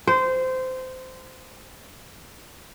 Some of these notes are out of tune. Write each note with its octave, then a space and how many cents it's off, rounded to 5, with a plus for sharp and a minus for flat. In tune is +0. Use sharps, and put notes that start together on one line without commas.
C5 -20